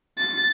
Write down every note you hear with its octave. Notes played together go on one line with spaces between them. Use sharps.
A6